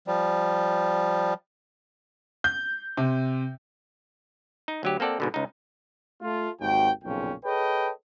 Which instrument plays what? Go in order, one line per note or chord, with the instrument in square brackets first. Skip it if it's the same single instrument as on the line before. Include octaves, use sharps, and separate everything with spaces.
[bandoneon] F3 G3
[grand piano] G6
C3
[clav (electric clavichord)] D#4
D2 F#3 G4
A#3 C4 A4 D5 F#5
G#2 B2 D3
C#2 D#4
[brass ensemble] A3 F4
G#1 D#2 F#4 G5
B1 F2 A#2 C#3 C#4 G5
G#4 A4 B4 C#5 D#5 G5